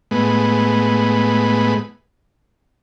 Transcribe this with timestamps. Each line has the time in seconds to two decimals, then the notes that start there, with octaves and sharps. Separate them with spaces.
0.11 A2 G#3 B3